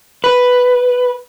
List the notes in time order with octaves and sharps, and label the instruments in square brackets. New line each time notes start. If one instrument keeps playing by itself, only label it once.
[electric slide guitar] B4